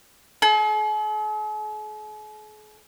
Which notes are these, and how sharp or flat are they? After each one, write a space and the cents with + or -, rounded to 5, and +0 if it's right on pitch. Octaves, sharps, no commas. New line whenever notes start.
G#4 +45